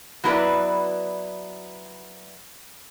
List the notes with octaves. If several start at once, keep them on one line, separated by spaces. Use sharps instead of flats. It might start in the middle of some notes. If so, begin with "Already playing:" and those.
F#3 B3 E4 F4 B4 D5